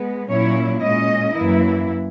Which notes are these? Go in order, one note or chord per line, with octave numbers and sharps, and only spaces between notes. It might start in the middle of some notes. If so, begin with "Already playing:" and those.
Already playing: G#3 B3
A#2 F#3 C#4 E4 C#5
A#2 G#3 C#4 D#5
F#2 E3 A#3 E4